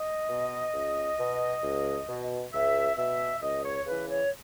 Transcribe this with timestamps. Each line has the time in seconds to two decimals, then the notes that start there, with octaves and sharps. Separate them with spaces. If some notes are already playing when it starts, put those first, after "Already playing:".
Already playing: D#5
0.29 B2
0.74 C#2
1.19 B2
1.63 C#2
2.08 B2
2.53 C#2 E5
2.97 B2 E5
3.42 C#2 D#5
3.65 C#5
3.86 C#3 E3 B4
4.09 C#5